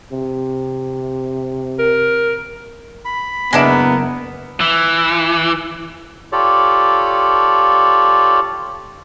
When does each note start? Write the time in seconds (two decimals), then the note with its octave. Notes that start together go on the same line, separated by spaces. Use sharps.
0.12 C3
1.79 A#4
3.05 B5
3.53 F#1 G#3 A#3 B3 D4 E4 F6
4.61 E3
6.32 F4 G4 A4 C#5 D5